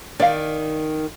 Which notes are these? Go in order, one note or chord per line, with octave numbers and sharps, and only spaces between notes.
D#3 D5 F5